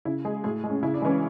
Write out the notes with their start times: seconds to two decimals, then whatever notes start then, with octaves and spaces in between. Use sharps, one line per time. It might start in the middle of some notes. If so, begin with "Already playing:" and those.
0.05 C#3 E4
0.25 G#3 G#4
0.44 A2 G#4
0.64 G#3
0.70 C#4
0.83 C#3 E4
0.94 D4
1.02 E3 G#3 C#4